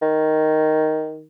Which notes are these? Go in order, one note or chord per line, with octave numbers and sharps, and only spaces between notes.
D#3